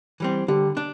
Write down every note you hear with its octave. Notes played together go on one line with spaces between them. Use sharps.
E3 G3 C4
D3 G3 G4
D4